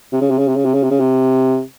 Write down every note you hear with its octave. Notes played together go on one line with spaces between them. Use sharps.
C3
C#3
C3
C#3
C3
C#3
C3
C#3
C3
C#3
C3